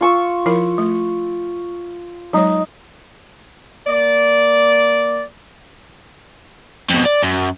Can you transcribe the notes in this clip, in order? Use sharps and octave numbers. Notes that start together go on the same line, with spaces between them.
F4 C#6 E6
F3 E4 A#4
A3
F#3 G#3 D#4 C#5
A#3 D5
F2 B2
D5
F#2